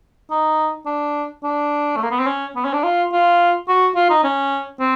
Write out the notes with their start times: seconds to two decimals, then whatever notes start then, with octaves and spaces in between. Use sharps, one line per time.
0.31 D#4
0.86 D4
1.43 D4
1.97 A3
2.03 A#3
2.11 B3
2.20 C4
2.27 C#4
2.56 B3
2.65 C#4
2.74 D4
2.84 F4
3.12 F4
3.68 F#4
3.96 F4
4.10 D#4
4.24 C#4
4.80 C4